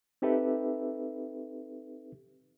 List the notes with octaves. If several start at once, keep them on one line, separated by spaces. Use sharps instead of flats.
C4 D#4 G4 A4 B4 E5